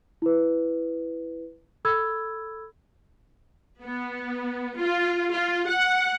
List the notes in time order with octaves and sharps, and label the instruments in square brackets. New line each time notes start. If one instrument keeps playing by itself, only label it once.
[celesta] E4 B4
A4 B5 E6 G#6
[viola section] B3
F4
F4
F#5